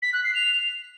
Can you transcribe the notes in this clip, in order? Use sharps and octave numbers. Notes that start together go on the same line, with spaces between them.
B6
F#6
C7
F7